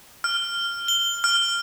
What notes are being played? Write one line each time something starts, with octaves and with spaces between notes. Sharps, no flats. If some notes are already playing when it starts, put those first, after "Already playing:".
F6
G7
F6